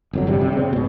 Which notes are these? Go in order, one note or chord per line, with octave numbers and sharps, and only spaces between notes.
G1 F2 F#3
G#1 G2 C3 G3
C3 G3
C#3 C4
G#2 B2